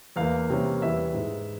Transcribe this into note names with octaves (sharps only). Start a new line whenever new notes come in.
E2 E3 A#3 F5
C3 E3 G3 A#3 C#4
E2 E3 G3 E5
G#2 E3 G#3